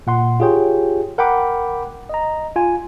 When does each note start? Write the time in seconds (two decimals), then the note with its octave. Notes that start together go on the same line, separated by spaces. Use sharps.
0.07 A#2 F#5 C6
0.40 F4 G4 G#4 C#5 G5
1.18 A#4 F#5 G5 B5 D6
2.09 D#5 A#5
2.56 F4 G#5